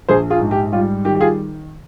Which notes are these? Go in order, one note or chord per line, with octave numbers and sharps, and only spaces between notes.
A#1 G#4 C5
F4 G#4
G#2
G4
G3 F4
D#3 G4
G4
F4 G#4